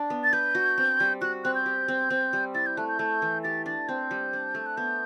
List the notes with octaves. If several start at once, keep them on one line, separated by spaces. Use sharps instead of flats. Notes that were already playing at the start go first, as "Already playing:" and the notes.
Already playing: D4
B3
A6
B4 G6
F#4
C4
G3
F#4 F#6
C4 F#6
G6
G4
C4
C4
G3
E4 A6
G6
A3 F#6
G6
A3
E3
G4 A6
D4 A6
C4 G6
G3
D4
A3
F#6
B3 G6